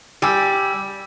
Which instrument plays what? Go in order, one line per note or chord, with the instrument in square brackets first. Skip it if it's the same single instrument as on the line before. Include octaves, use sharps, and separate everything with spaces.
[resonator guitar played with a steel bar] G3 [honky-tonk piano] G#5 D6 E6